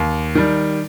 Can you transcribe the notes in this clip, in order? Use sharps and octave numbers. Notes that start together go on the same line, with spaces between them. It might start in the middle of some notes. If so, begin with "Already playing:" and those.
Already playing: D#2
D#3 G3